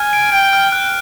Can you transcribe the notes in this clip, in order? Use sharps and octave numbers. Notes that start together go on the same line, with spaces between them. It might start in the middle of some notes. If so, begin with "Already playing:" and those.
Already playing: G#5 F6
D7
G5 D7
F6
F#6